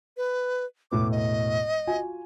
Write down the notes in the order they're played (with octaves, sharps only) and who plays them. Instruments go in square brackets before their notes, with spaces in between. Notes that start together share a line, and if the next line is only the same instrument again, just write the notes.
[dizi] B4
[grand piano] E1 A2 B3 [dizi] D6
[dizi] D#5
[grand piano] F4 F#4 G#5